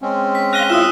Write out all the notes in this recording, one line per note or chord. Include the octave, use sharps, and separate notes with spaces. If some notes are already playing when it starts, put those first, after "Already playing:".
G#3 C4 C#4
B6
F5 F#6 A#6 D#7 G7
E4 F4 D#6 E6 E7